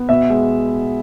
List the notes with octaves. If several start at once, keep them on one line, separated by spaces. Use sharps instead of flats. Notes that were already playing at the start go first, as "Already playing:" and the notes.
Already playing: B3
B2 E5
G#3